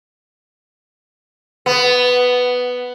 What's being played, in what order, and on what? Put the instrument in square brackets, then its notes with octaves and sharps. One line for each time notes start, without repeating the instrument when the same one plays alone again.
[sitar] B3